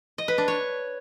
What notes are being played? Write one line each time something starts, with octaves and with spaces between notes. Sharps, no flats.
D#5
B4
D4
C#5